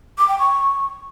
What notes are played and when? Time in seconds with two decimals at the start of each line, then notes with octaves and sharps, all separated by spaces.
0.18 D6
0.28 G5
0.39 C#6